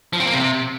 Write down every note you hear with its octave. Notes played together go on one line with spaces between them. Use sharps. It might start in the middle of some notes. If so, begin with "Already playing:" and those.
F3
C4
A#3
C3